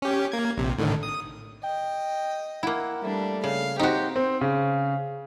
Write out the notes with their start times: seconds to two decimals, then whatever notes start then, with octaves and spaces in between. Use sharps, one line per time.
0.02 C#4 G4
0.32 A#3 G#6
0.58 A#1 C3
0.78 A2 D3 D#3
1.03 D#6
1.64 D#5 G5
2.63 A#3 E4 F#5
3.03 G3 A3 D4
3.44 C#3 F5
3.80 C4 D#4 F#4 G4
4.16 C4
4.41 C#3